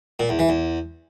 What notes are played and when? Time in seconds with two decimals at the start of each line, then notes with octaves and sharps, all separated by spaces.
0.19 A#2
0.29 E2
0.39 E3
0.49 E2